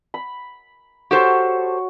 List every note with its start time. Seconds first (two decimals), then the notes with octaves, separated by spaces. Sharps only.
0.14 B5
1.11 F#4 G4 A4 C5 C#5